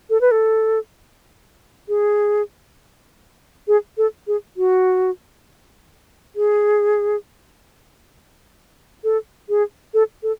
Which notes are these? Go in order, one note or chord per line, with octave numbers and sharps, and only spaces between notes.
A4
B4
A4
G#4
G#4
A4
G#4
F#4
G#4
A4
G#4
A4
A4